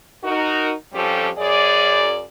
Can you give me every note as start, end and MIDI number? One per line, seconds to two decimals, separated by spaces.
0.24 0.72 63
0.24 0.72 66
0.24 0.72 70
0.93 1.29 41
0.93 1.29 53
0.93 1.29 55
0.93 1.29 61
0.93 1.29 67
0.93 1.29 69
1.37 2.24 42
1.37 2.24 68
1.37 2.24 74